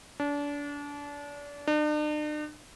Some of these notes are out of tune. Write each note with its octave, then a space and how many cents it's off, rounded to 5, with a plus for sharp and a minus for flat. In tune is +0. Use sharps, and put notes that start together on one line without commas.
D4 -30
D4 +45